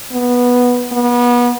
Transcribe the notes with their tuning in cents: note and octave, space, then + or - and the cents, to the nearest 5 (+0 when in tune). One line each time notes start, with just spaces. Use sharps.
B3 -10
B3 -30